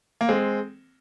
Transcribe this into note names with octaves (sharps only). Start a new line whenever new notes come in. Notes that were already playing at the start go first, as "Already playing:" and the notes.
A#3
G#3 C4